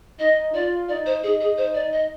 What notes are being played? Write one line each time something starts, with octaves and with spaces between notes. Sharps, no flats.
D#4 D#5
F4 D5
D#4 D5
C5
D#4 G#4
G#4
C5
D5
D#5